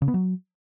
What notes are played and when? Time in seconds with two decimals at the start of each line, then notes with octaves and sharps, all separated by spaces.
0.02 C#3
0.08 B3
0.14 F#3